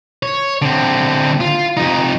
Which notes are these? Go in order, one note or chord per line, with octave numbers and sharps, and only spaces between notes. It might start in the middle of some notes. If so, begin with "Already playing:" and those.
C#5
D3 C4
F4
F2 D#4